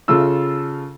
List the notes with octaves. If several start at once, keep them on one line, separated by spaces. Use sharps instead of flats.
C#3 F4 A4 E6